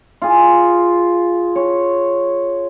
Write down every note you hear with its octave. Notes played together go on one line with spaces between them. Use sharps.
F4 G#4
C#5